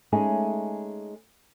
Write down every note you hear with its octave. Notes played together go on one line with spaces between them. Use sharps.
G#3 A3 C#4 D#4 G#4